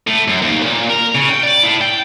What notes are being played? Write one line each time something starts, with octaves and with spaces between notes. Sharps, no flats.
A2
F#2
D#2
A#2
A#4
C#3
G5
D5
A2
G5